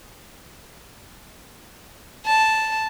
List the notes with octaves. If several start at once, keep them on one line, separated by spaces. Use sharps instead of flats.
A5